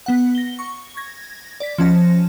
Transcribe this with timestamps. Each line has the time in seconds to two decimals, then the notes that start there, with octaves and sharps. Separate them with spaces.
0.06 B3 F#5
0.35 A#6 G7
0.59 C#6
0.97 G#6 A#6
1.60 D5 B6
1.78 F3 C#4 A5 A#6